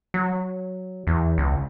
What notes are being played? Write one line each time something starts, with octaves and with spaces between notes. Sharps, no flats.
F#3
E2
C#2